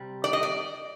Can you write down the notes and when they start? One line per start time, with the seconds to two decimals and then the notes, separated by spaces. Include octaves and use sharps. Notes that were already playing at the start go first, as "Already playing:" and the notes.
Already playing: C3 G3
0.24 D5
0.33 D#5
0.43 D5